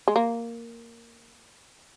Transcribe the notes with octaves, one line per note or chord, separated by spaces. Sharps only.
G#3
A#3